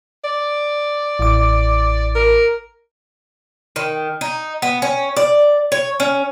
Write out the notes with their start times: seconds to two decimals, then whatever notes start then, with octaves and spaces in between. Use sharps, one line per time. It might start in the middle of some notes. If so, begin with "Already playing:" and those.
0.24 D5
1.19 A1 D6
2.15 A#4
3.76 D#3
4.21 D#4
4.62 B3
4.82 C#4
5.17 D5
5.72 C#5
6.00 C#4